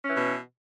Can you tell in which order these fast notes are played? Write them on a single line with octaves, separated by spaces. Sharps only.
C#4 E3 B2